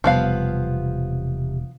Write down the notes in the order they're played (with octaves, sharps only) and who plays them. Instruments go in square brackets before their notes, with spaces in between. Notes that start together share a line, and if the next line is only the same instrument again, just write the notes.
[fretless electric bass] E1 G3 [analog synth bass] C3 [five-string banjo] F3 B3 F5